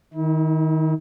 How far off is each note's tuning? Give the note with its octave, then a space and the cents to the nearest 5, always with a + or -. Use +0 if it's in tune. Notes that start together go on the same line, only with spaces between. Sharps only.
D#3 +10 E4 -40